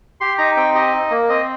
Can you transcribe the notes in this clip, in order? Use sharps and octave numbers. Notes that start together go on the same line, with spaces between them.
G4 C6
D#4 A#5
C4 G5
G4 D#5
D#4
A#3
C4 D#5